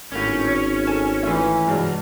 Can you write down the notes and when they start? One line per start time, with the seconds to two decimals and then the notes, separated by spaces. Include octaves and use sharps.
0.12 G#1 A2 A#3 C#4
0.47 C#5
0.87 A4 G#5 E7
1.23 E3 A3 F4
1.67 C2 G2 F#3 G#3